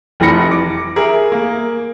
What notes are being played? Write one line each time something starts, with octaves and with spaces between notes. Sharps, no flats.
F1 E3 F3 B5 A#6 C#7
D6
G#4 A#4 E5
A#3